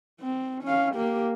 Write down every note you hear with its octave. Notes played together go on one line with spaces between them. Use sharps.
C4
C#4 F5
A#3 G4